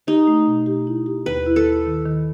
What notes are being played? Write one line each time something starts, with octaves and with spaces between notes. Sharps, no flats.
D#4 G4
A3
B2
G4
E4
G4
D#2 B4
E4
A4
E4
D#3
D#3